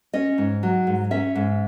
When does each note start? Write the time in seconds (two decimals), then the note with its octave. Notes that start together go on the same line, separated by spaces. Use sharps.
0.13 C#4 D#5
0.38 G#2
0.63 F#3
0.87 G#2
1.11 C#4 E5
1.35 G#2